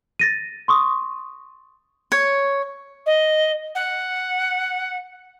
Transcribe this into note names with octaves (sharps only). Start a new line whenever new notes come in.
A6 A#6 D#7
C6 C#6 D#6
C#5
D#5
F#5